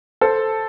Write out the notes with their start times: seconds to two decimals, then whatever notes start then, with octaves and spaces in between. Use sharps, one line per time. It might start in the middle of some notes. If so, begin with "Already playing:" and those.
0.21 A4 C5